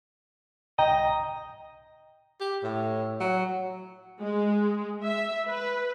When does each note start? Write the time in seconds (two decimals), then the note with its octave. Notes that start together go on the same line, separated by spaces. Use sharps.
0.79 C2 D#5 G5 A#5
2.40 G4
2.63 A2
3.20 F#3
4.20 G#3
5.03 E5
5.47 B4